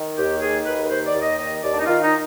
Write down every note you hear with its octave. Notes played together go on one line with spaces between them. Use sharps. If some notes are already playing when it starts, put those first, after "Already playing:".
Already playing: D#3
D#2 G4
D#3 G#4
D#2 B4
D#3 C5
D5
D#2
D#5
D#3 D#5
D#2 D5
D4
D#4
D#3 F4
D#4